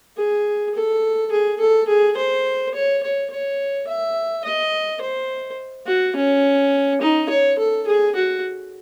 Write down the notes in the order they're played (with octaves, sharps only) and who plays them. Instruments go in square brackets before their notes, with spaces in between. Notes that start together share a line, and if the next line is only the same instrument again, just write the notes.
[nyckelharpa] G#4
A4
G#4
A4
G#4
C5
C#5
C#5
C#5
E5
D#5
C5
F#4
C#4
D#4
C#5
A4
G#4
F#4